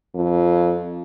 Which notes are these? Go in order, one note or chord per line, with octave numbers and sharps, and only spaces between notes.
F2